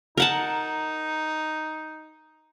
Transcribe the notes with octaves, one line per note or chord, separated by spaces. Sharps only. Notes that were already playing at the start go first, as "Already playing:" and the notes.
D#4 A#4 F#5 A5